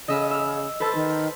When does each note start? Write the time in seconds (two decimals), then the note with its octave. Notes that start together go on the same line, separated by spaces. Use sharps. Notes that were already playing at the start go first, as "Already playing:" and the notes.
0.08 C#3 D#5 E5 F6
0.31 E6 F6
0.80 A4 B4 C5 A5
0.95 D#3